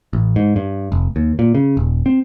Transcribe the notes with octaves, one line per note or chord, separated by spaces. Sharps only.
A1
G#2
G2
F1
D#2
A#2
C#3
D#1
C4